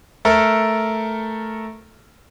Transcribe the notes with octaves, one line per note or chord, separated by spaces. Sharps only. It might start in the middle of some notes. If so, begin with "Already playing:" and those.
A3 A4 A#4